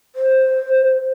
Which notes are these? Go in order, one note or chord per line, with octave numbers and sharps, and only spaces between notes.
C5